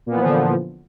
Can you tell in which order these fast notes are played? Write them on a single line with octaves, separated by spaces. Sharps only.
A#2 B3 E3 F3 D3